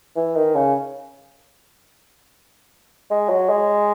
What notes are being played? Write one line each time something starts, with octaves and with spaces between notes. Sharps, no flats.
E3
D#3
C#3
G#3
F#3
G#3